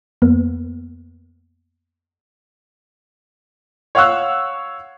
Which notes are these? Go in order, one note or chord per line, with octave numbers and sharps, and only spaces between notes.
F2 A#3 B3
C#5 F5 F#5 C#6 E6 F#6